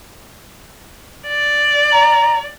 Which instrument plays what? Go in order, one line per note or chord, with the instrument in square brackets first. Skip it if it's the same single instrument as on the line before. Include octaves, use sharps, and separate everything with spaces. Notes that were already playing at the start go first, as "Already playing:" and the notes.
[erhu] D5
[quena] A#5